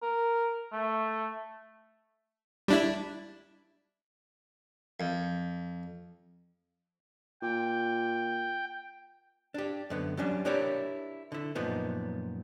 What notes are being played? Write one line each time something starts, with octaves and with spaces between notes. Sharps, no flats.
A#4
A3
G3 D4 E4
F2
A#2 G5
D4 G4
F#2 D3 B3
F#3 G3 C#4 D4
D4 E4 G4 A#4 C#5 D5
D3 E4
F#2 A#2 F3 B3 D#4